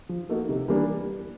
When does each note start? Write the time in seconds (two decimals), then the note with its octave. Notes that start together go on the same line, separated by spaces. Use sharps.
0.09 F3
0.29 A#3 D#4 F#4 A4
0.49 C3
0.68 E3 G3 A#3 D4